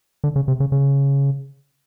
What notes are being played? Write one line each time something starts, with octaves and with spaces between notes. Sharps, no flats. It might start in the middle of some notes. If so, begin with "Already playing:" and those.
D3
C#3
C3
C#3
C#3